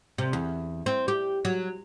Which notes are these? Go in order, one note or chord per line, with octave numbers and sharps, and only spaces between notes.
C3
E2
C4
G4
F#3